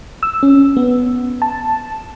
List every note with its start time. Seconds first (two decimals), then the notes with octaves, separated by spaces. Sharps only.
0.23 E6
0.43 C#4
0.77 B3
1.42 A5